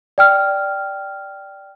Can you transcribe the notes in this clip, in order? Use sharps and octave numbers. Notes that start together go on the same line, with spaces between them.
D5 G5 F6